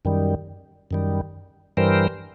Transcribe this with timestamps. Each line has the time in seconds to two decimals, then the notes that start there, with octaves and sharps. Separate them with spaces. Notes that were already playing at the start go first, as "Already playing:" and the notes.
0.05 F#2 D#3 G3
0.91 F#2 D#3 G3
1.77 G2 E3 G3 A#4 C5